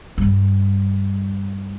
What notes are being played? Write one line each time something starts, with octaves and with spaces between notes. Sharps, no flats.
G2 G3